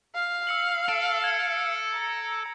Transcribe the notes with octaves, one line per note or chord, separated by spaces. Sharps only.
F5
E6 C#7 F#7
A4 D7
G#6 C#7
A#5